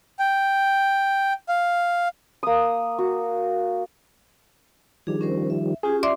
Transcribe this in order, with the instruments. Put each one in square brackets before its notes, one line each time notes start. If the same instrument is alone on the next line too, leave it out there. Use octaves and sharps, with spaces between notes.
[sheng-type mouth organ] G5
F5
[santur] A#3 D#6
F#4
[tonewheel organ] D#3 F3 G3 [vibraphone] D4 G#4
[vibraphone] C#4 A#4 C5
E5
[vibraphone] C#4 F4 G4 [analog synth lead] G#4
[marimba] D5 E5 D6 [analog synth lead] C6